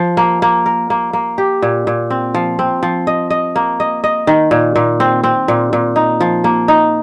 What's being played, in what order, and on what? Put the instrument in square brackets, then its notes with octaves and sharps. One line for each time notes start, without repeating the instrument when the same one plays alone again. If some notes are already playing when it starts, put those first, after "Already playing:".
Already playing: [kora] F3
A#3
A#3
A#4
A#3
A#3
G4
A#2
A#2
C4
F3
C4
F3
D#5
D#5
A#3
D#5
D#5
D#3
A#2
A#2
C4
C4
A#2
A#2
D#4
F3
A#3
D#4